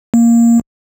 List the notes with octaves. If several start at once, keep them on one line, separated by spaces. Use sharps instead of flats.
A#3